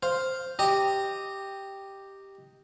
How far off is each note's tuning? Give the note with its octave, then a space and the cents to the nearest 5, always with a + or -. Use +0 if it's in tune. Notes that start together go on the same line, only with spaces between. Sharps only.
C5 +0 F5 +0
G4 +0 D#5 +5 A#5 -20